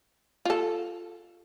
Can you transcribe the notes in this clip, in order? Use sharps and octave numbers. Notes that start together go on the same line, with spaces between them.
F4 A4